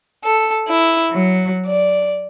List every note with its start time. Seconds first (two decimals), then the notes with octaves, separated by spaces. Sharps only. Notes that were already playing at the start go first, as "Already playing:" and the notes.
0.24 A4
0.67 E4
1.11 F#3
1.66 D5